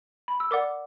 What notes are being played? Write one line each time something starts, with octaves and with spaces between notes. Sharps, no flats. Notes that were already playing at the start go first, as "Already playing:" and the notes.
B5
E6
A#4 D5 F#5 D6